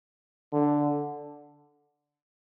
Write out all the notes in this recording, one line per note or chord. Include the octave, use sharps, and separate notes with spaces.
D3